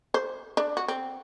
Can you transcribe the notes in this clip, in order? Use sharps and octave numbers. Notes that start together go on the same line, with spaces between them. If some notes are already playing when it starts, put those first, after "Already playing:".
C5
D4
F#4
C4